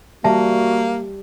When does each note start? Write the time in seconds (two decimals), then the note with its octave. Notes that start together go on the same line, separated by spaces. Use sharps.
0.24 G3 A#3 F#4 E5 A5